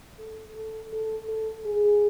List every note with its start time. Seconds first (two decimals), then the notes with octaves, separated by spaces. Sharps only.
0.19 A4
0.55 A4
0.93 A4
1.29 A4
1.65 G#4